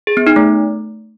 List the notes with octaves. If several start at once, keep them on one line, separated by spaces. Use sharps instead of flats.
G#4
B3
D#4
A3